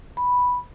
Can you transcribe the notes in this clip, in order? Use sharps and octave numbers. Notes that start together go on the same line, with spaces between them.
B5